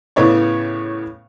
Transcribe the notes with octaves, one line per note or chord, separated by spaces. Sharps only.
A2 C#3 B3 C#5 D5 C#6